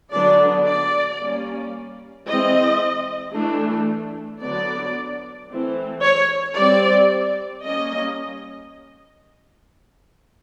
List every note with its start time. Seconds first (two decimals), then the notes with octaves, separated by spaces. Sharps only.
0.12 D3 F#3 B3 D4 D5
0.66 D5
1.19 G3 A#3 C#4
2.27 E3 G#3 C4 D#5
3.34 E3 A3 D4
4.41 D3 F#3 B3 D5
5.49 E3 A3 C4
6.02 C#5
6.56 G3 C4 D5
7.63 G3 A#3 C#4 D#5